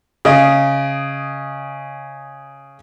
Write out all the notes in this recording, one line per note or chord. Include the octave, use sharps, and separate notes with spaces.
C#3 D#5